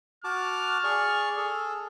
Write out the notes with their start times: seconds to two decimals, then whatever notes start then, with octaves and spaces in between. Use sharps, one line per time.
0.24 F#4 A5 D6 F6
0.84 G#4 D5 C#6
1.37 G#4 A4